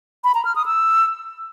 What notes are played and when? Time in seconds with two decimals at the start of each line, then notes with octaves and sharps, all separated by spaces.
0.24 B5
0.34 A#5
0.45 F6
0.55 D#6
0.66 E6